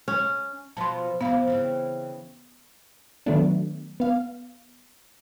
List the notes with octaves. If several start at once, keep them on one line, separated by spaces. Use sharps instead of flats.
C#4
B2 F3 B3 A5 C6
C3 F3 B3 F5
C#3 E3 C4
D#3 F#3 A3 B3 D4
B3 F5